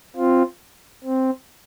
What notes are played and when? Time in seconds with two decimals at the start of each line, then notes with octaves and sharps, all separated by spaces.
0.16 C4 F4
1.04 C4